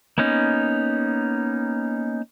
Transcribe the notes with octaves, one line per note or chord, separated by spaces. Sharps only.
A#3 B3 C#4 D#4